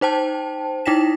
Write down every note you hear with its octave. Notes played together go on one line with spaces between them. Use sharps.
D#4 C5 G5 A5
D#4 E4 G5 A#6 B6 E7